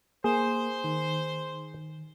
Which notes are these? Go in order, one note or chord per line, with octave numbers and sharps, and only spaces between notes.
A#3 G#4 C5
D#3